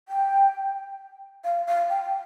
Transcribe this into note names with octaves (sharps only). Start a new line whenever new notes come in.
G5
F5
F5
G5